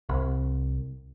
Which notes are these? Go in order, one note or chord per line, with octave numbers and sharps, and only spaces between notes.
C2